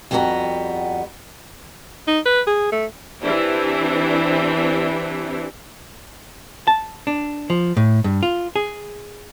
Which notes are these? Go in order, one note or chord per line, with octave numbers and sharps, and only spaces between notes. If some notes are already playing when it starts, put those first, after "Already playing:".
F2 G3 B3 E4 F#4 A#5
D#4
B4
G#4
A3
E3 C4 D4 E4 G4
A5
D4
F3
A2
G2
F4
G#4